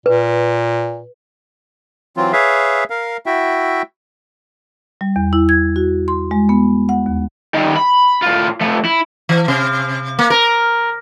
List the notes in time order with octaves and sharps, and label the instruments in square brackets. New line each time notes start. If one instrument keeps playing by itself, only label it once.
[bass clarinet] A#2 [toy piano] B4
[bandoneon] E3 F#3 C4 F4
G#4 B4 C#5 E5 F5
A#4 F5
E4 F#4 E5 G5
[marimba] G3
E2
E4
G#6
F#4
C6
G#3
B3
F#5
D#2
[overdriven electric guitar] D#3 G3
B5
A2 F4
F3 A3
E4
[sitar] E3
C3
A#3
A#4